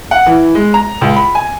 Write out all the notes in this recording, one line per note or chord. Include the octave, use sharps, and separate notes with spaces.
F#5
E3
G#3
A#5
C#2
B5
G#5